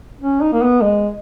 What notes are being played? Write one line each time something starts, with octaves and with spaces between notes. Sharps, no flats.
C#4
D#4
A#3
B3
G#3